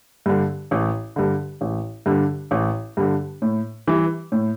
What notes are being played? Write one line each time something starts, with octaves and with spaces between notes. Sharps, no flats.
G2 D3
A1
G2 D3
A1
G2 D3
A1
G2 D3
A2
E3 G3
A2